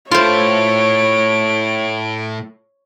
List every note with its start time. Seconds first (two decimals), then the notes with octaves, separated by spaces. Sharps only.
0.11 A2 A3 F4 C5 C#5 D7